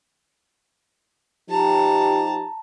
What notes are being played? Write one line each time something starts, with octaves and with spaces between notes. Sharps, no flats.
F3 D#4 G4 A5 A#5